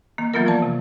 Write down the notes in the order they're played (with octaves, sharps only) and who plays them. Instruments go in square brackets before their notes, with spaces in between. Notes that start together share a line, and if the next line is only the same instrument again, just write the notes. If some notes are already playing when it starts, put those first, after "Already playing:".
[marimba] D#3 A#3
E3 F#3 A#3 B3 F4 A#4
F3 F#3 A#3 D5 A5
C3